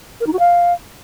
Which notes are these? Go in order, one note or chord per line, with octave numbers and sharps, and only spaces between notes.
A#4
D#4
F#4
F5